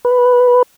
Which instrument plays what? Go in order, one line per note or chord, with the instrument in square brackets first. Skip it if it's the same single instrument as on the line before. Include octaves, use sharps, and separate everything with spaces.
[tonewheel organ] B4